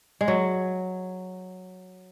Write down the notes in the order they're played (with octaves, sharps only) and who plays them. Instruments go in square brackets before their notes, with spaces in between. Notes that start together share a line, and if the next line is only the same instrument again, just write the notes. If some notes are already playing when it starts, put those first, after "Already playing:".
[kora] G#3
F#3